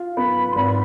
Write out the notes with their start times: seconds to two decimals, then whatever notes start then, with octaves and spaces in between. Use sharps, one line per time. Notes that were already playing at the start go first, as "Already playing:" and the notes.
Already playing: F4
0.17 B3 B5
0.51 C6
0.56 G#1 B5